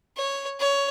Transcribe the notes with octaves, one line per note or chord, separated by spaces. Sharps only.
C#5
C#5